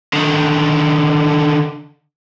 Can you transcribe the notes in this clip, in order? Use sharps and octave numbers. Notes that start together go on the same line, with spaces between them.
D3 D#3